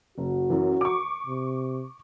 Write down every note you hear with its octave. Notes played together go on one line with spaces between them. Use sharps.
F#1 F#4
F#2 E3
C#6 D6
C3